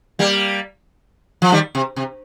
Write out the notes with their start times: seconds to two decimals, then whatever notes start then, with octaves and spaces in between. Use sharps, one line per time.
0.19 G3 A#3
1.42 F3
1.52 D#3 G3
1.75 C3
1.96 C3